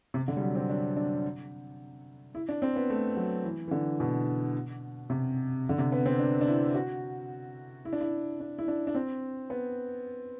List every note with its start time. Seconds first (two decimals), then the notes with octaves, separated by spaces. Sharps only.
0.14 C3
0.28 D3
0.37 G3
0.41 F#3
0.55 C4
0.70 D4
0.96 D4
2.35 E4
2.49 D4
2.62 C4
2.76 B3
2.90 A3
3.17 F#3
3.44 E3
3.68 E3
3.71 D3
4.00 B2
5.10 C3
5.69 D3
5.78 C3
5.92 B3
6.06 C4
6.19 D4
6.41 D4
6.47 E4
6.74 F#4
7.85 E4
7.93 D4
8.01 E4
8.40 D4
8.58 E4
8.68 D4
8.87 D4
8.95 C4
9.50 B3